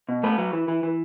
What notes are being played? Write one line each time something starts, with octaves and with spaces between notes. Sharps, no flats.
B2
A3 B4
F#3
E3
E3
E3